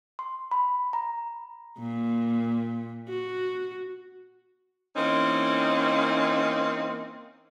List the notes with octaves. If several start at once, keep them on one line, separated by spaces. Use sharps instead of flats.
C6
B5
A#5
A#2
F#4
E3 A#3 C4 C#4 D#4